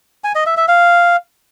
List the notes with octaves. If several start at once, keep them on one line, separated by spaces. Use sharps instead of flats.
G#5
D#5
E5
E5
F5